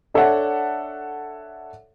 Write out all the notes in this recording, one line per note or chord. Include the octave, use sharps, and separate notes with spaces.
D4 A4 C#5 E5 F#5